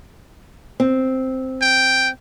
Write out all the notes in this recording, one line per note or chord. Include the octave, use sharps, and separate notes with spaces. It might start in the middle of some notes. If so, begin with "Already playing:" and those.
C4
G5